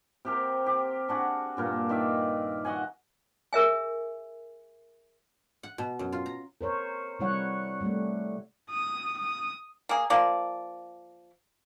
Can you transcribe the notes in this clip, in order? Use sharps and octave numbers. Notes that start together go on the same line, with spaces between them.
C3 G4 A#4
G4
D4 F#4 G#4
G2 A#2 A#4
D#3 D5 E5 F5
F#4 D#5 F#5 G#5
G#4 A#4 E5 G#5
F#5
B2
F#2
F4
A#5
A#4 C5 C#5
C3 G3 E4 C#5 F#5
G3 A3
D#6
D#6
A#3 G#4
F3 A#3 D5